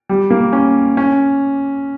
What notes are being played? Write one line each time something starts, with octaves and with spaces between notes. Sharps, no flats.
G3
A#3
C#4
C#4